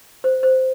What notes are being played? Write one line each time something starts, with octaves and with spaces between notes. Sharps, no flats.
C5
C5